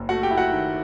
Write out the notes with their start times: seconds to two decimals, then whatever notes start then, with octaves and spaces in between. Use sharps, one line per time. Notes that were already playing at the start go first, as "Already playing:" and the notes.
Already playing: F#1
0.09 A3 F#4 F#5
0.23 G4 G5
0.31 E4
0.38 F#4 F#5
0.51 D#3